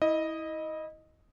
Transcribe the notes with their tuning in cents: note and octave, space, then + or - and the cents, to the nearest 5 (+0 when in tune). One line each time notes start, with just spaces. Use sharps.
E4 -25 D#5 +0